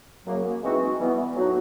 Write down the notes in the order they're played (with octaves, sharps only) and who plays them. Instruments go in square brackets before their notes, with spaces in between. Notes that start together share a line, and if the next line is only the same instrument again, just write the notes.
[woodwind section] F#2 C#3 F#3 A#3
E3 G#3 C4 D#4 F#4
E3 G3 B3
A2 F#3 B3 D#4 F#4